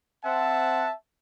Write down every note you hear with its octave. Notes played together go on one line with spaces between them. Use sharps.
C4 E5 F#5 A5